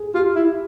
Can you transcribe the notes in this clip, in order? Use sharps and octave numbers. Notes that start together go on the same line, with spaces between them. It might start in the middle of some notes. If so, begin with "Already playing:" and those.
Already playing: G#4
F4 G4
E4